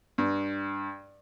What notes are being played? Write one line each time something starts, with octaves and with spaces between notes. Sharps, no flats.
G2